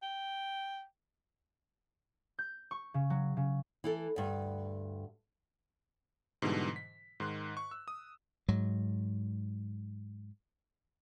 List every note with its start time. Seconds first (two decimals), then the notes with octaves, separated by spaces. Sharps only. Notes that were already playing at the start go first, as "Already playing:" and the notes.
0.02 G5
2.39 G6
2.71 C#6
2.94 C#3
3.10 F#3
3.37 C#3
3.84 E3 E4 A4
4.16 D2 G2
6.42 G#2 B2 D3 E3 G3
6.76 B6
7.20 G#2 D#3 C6 F#6
7.57 C#6
7.71 E6
7.88 D#6
8.48 G#2 F#3